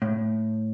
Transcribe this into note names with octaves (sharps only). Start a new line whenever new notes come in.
A2